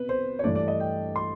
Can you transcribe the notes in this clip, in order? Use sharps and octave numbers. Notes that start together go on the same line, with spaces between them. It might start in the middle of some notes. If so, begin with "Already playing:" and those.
Already playing: C3 B3 B4
C5
C#5
G2 E3 A3 D4 D5
D5
D#5
G5
C6